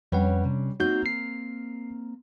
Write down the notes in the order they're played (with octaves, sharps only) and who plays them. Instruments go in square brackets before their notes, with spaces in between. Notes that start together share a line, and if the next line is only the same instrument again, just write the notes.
[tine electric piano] F2 B4 F#5 [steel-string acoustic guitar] G3 C#4 D4
[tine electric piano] C3
[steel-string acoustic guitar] A#3 C4 A#4 [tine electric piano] D#4 F#4 G6
[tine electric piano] C7